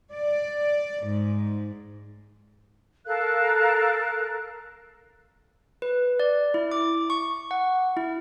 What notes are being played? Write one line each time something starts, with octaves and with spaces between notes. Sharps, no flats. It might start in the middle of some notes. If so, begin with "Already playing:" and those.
D5
G#2
A4 A#4 F5 F#6
B4
D5
E4
D6
C#6
F#5
E4